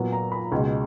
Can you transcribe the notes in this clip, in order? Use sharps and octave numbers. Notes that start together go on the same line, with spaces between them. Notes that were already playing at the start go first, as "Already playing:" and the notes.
Already playing: A#2 F#3 B3
A#5
B5
C#2 B2 G#3